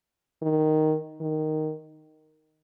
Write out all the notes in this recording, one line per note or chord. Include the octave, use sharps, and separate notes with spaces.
D#3
D#3